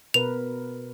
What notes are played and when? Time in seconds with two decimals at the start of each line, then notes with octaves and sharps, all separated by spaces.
0.14 B2 A#4 B4 F7